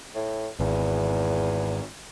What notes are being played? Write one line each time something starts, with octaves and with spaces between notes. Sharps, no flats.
A2
G#1 E2